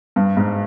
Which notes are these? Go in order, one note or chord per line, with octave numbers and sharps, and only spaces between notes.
G2
G#2